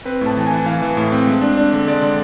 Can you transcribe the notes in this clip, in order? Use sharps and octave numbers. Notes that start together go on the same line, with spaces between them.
C4 B4
A2
A5
E3 A5
E3 G#5
E3 F5
E3
A2
C4
G#3
D4
D4
D3
G#3 D5
D3